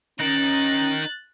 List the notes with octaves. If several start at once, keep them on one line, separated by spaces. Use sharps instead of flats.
C#4 D#4 A#4 F#6 A6